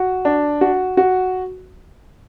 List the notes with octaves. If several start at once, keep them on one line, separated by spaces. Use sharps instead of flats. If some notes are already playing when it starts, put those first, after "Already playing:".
Already playing: F#4
D4
F#4
F#4